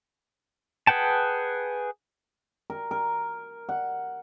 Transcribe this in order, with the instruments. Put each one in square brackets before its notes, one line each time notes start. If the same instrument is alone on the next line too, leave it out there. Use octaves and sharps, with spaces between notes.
[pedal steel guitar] G#4 B4 F#5 G5 A5
[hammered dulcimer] A#4
A#4
F#5